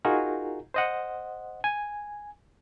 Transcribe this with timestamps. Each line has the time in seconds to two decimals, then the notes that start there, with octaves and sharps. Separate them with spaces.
0.05 D#4 F4 F#4 G#4 A#4
0.74 C5 D#5 F#5
1.64 G#5